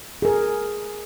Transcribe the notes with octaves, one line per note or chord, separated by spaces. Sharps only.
G#4 A#4